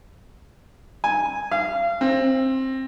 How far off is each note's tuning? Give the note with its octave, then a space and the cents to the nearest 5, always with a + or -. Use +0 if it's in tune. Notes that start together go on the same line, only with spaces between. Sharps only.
G#5 -10
F5 -35
C4 +15